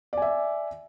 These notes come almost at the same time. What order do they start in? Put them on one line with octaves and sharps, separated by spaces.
D5 G#5 E5